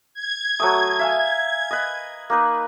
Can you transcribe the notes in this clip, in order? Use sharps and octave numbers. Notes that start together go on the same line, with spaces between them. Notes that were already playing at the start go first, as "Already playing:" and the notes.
G#6
F#3 A3 D#6
E5 F5 G#5
B4 D#5
A#3 D#4 B4